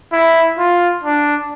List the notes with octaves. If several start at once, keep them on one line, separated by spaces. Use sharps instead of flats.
E4
F4
D4